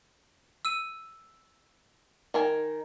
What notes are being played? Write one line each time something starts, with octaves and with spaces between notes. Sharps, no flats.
E6 D#7
D#3 A#4 G#5